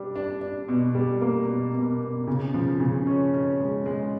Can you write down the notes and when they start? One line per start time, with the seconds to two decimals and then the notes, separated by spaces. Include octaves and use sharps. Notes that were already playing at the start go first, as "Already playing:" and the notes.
Already playing: G3 D4
0.16 D4
0.41 D4
0.69 B2
0.95 G3
1.21 A#3
1.48 B2
1.74 B2
2.01 B2
2.27 C#3
2.54 F3
2.80 C#3
3.07 C#4
3.34 C#4
3.60 G#3
3.86 G#3